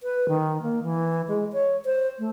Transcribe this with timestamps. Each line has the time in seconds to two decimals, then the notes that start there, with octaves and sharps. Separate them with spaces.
0.03 B4
0.29 D#3
0.62 A#3
0.83 E3
1.28 G#3
1.53 C#5
1.85 C5
2.19 A3